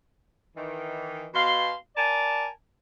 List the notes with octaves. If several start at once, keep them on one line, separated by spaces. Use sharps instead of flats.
D#3 E3
B2 F5 C6
A#4 D5 G#5 A5